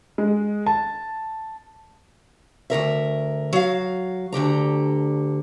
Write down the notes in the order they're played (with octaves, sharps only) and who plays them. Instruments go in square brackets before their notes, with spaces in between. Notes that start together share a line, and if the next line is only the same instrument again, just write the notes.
[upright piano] G#3
A5
[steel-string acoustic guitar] D2 B2 A#4 E5
F#3 F5
D2 D3 G4 A#5